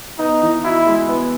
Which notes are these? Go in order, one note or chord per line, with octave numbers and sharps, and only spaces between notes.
B3 D#4
E3
E4 F#4
G#3
B3